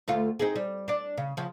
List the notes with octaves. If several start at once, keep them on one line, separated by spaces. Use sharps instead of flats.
D2 A3 F4
C4 D#4 G#4
G3
D4 D5
C#3
C#3 F3